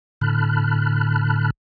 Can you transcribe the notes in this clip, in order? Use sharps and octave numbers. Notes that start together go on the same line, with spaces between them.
A2 D3 A5 B5 F6 F#6